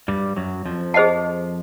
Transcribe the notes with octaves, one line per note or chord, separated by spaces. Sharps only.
G2 G3
F#2 F#3
F2 F3
G#4 C5 D#5 F#5 A5